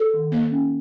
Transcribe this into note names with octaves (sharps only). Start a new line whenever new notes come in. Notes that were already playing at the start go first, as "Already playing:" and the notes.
Already playing: A4
D#3
A#3
C#4